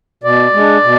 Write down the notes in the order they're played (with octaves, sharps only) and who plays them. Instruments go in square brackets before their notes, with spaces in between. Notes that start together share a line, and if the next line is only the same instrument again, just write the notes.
[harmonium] B2 D5
G#3 D4
B2